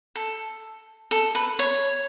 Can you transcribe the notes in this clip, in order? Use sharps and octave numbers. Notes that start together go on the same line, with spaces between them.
A4
A4
B4
C#5